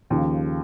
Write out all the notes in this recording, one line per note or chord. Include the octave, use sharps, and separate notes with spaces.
D#2 C#3 F3